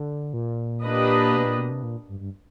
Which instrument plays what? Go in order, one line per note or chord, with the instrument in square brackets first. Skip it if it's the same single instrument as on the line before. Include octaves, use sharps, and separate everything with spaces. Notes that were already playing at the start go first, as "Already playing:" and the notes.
Already playing: [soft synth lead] D3
A#2
[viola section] A#3 D4 G4 B4 D#5
[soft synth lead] B2
A#2
B2
C3
A#2
G2
G2